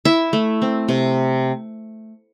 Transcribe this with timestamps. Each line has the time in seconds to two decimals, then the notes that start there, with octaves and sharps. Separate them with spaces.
0.05 E4 E5
0.33 A3
0.62 C4
0.89 C3